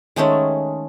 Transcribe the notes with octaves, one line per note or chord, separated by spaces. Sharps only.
D#3 G#3 A3 C#4